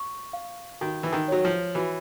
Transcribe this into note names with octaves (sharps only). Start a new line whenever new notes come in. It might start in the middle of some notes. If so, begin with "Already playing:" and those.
Already playing: C#6
F5
D#3 F#4
E3
D#3
F#3 C#5
F3
E3 F#4